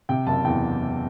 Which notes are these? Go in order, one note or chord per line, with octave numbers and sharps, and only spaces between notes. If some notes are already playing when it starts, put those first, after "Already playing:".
C3 G5
F#1 A5
E2 G5